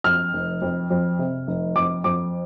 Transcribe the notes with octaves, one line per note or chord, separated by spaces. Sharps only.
F2 F6
F1
F2
F2
C3
F1
F2 D6
F2 D6